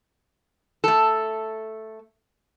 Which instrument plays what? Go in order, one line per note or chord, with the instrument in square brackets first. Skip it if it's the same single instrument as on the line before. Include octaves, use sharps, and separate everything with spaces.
[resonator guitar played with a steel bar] A3 A4